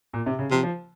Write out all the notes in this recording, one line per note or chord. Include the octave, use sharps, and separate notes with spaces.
A#2
C3
C#3
C3 F3
F3